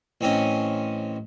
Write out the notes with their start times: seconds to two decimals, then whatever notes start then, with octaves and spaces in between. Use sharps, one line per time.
0.21 A1 C4 C#4 D#5